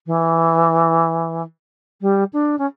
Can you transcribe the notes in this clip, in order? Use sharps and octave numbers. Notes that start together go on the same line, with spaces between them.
E3
G3
D4
C#4